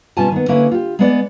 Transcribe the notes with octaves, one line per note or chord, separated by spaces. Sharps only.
B2 G3 C#4 F4 G#5 A5
D#3 B3
D3 A#3 C#4 E4 B4
F4 G4
G#3 B3 D5